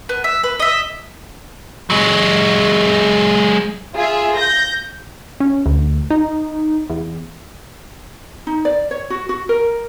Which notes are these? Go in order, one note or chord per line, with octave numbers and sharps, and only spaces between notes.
B3
E5
B4
D#5 E5
F#3 G#3
F4 G#4 E5
G6 A#6
C#4
D2
D#4
E2
D#4
D5
C#5
F#4
F#4
A#4